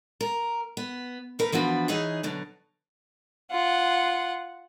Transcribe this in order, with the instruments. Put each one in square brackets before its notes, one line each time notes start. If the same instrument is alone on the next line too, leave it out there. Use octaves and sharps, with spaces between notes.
[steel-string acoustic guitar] A#4
B3
A3 A#4 B4
E3 F3 B3 D4 F#4
E3 D#4 G#4 C#5
B2 D3 F#3
[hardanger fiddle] F4 F#5